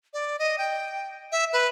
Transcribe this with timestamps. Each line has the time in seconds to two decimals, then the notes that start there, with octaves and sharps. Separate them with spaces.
0.13 D5
0.39 D#5
0.58 G5
1.32 E5
1.53 B4